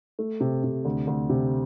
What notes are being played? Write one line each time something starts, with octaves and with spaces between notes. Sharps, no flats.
A3
C3
C3
D2
D2
C3